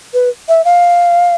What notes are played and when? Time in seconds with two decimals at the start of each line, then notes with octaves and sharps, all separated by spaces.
0.14 B4
0.49 E5
0.65 F5